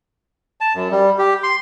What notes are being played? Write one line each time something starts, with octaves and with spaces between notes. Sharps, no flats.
A5
F#2
G3
G4
C6